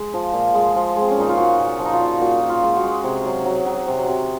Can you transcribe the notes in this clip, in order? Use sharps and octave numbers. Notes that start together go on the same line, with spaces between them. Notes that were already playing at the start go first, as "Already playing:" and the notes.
Already playing: G#3
F3
A#2
G#3
F3
G#3 C4
C#4
A#2 D#4
F4
A#2 F#4
A#2
F#4
F3
D#4
F4
A#2
A#2 F#4
A#2
F4
G#3
F#4
G#3
C3 G#4
F#3
F#3
F#3
C3
C3